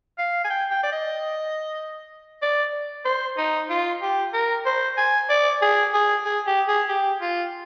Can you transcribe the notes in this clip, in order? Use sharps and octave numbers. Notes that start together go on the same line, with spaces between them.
F5
G#5
G5
G5
D5
D#5
D5
C5
D#4
F4
G4
A#4
C5
G#5
D5
G#4
G#4
G#4
G4
G#4
G4
F4